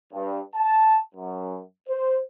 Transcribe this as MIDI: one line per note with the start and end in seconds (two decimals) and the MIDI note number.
0.13 0.40 43
0.55 0.98 81
1.15 1.60 42
1.89 2.19 72